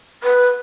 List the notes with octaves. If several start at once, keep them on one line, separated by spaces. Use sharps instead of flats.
B4